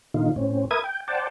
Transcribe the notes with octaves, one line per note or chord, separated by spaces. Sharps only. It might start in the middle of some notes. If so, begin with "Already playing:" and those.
A#2 D3 D#3 D#4 F4
A2 C4 C#4
A#4 B4 E5 D#6 G#6
G5
C5 D5 F#5 G5 A5